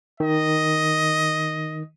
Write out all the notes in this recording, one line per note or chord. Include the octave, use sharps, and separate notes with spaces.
D#3 D#5